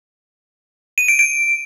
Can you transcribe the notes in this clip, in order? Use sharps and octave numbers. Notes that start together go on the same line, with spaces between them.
D#7
D7
D7